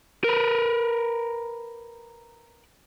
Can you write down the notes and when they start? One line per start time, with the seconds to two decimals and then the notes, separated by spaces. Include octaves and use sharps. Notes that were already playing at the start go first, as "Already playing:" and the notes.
0.24 A#4 B4